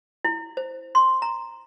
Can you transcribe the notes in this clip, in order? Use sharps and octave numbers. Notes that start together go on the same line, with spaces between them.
E4
C5
C6
A#5